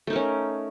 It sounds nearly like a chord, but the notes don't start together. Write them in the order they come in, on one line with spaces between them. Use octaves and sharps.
A3 D#4 A#4 C#4